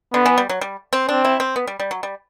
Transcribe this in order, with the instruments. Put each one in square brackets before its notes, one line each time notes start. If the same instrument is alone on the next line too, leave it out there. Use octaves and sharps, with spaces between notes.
[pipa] D3 [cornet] B3
[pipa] E3
G3
F#3
G3
C4
[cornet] C4 [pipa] D4
[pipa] E4
C4
B3
G3
G3
F#3
G3